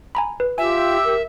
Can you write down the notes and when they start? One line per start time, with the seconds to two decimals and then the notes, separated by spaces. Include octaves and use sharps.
0.15 G#5 A#5 B5
0.40 B4
0.58 F4 G4 E5 G#5 E6
1.05 A#4